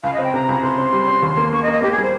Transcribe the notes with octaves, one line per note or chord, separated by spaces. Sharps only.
C#2 F5
D#5
C4
G5
C3 A#5
C#2
C3 C6
C4
G3
C4
D#2
A#3
A#3 C#6
D#5
A#3
D#5
A#3 G4
G#4
G3
C5